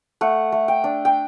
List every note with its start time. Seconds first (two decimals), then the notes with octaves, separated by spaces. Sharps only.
0.21 A3 F#5
0.52 A3
0.68 G5
0.84 D4
1.05 G5